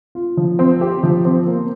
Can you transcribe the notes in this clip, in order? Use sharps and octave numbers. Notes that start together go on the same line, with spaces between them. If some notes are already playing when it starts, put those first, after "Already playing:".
F4
F3
C4
G4
F3
C4
A#3